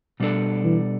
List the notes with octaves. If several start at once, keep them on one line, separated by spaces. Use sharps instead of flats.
B2 G3 D4 A4
E3